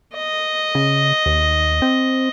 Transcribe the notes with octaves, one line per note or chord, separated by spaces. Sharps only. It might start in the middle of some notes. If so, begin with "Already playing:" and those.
D#5
C#3
D#2
C4